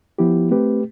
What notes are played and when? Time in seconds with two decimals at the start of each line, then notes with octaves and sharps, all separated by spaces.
0.19 F3 B3 E4 G4
0.51 A3 C4 G4 B4